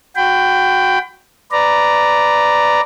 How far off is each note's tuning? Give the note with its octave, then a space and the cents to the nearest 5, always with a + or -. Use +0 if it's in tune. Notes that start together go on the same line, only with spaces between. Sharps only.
F#4 -15 G5 +0 B5 +35
B4 +10 D5 +0 A#5 +0